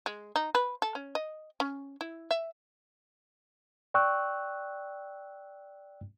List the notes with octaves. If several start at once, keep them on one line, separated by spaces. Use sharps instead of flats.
G#3
D#4
B4
A4
C#4
D#5
C#4
E4
E5
D5 G5 C#6 E6 F#6